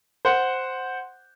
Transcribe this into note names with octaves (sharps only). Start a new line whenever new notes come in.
C5 F#5